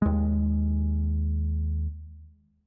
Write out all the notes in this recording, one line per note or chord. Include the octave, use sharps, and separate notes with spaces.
D#2 G#3